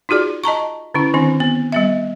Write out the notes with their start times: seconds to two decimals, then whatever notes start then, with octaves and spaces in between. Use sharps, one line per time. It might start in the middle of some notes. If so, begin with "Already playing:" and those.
0.09 D#4 F4 F#4 G#4 D5
0.44 D#5 A5 A#5 C#6
0.94 D3 C#4 E4
1.14 D#3 C4 D4
1.40 B3
1.72 G3 B3 E5